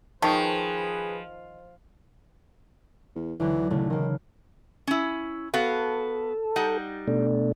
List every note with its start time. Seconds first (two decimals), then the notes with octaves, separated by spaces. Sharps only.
0.22 D#3 F3 G#4 B4 A5 C#6 D#6
3.16 E2
3.40 D2 D3 E3 F#3
3.70 D#1 A2 C#3 A3
3.90 D#3 E3 A#3
4.87 C#4 E4
5.54 B3 F#4 A4 F5
6.56 G3 D#4 F#5
7.08 B2 A3 D4